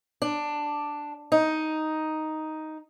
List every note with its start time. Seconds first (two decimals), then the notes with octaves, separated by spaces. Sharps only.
0.22 D4
1.32 D#4